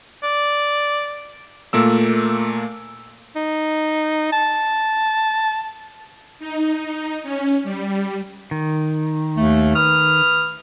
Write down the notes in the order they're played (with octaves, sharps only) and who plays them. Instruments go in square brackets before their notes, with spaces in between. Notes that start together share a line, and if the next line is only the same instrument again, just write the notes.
[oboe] D5
[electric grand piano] A#2 A3 A#3 E6
[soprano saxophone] D#4
A5
[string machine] D#4
C#4
G3
[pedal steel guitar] D#3
[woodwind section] D#2 A3
B4 D#6 F6